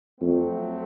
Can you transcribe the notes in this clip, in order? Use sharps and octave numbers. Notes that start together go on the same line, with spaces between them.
F2 F#3 A3 C4